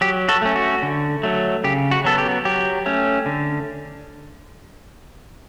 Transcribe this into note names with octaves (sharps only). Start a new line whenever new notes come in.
F#3 G4
F#4 A4
A3 C#4
F#4
D3
F#3 A3
C#3 G4
F#4
F#3 B3 A4
G4
F#3 G4
A3 C#4
D3